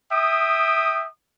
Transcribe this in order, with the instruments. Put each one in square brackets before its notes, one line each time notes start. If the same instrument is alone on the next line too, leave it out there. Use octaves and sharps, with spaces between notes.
[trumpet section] E5 G5 D#6